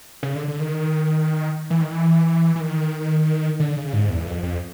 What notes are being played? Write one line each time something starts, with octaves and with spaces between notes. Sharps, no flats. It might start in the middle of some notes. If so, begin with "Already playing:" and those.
C#3
D3
D3
D#3
E3
D#3
E3
E3
D#3
D3
C#3
G#2
E2
F2
F2